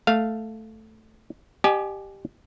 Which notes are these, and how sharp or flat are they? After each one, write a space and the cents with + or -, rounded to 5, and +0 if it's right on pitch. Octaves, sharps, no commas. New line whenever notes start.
A3 +0 F5 +0
G4 +0 D#5 -40 G#5 +25